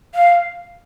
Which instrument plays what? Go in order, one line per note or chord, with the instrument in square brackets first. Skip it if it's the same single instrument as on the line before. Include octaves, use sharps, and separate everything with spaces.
[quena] F5